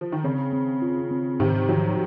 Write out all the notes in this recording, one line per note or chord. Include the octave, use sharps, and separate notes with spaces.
F3
D#3
C#3 C4
C4
F4
C4
G#2 C3 D#3
D#3 F3 F#3